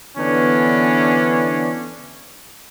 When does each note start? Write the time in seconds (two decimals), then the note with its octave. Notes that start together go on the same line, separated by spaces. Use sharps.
0.18 D3 E3 B3 C#4 D4